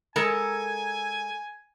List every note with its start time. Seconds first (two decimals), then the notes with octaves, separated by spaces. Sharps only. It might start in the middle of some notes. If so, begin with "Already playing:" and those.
0.16 G#3 A4 A#4 G#5